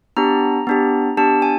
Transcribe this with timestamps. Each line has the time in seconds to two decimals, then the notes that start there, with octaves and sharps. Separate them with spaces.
0.17 B3 D4 G4 A#5
0.67 B3 D4 G4
1.17 B3 D4 G4 A5
1.42 G#5